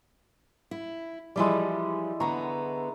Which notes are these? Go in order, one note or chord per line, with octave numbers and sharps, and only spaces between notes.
E4
E3 F3 G3 G#3 E4 D5
D3 B3 A#5 C#6